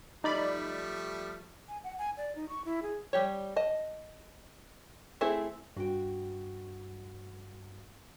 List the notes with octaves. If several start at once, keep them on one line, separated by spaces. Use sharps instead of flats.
F3 G3 A3 D#4 D5 B5
G#5
F#5
G#5
D5
D#4
C#6
E4
G#4
G3 G4 C#5
D#5 A5
A3 C4 E4 G#4
G2 F#4 G5